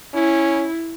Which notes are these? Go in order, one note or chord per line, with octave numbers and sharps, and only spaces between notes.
C#4 E4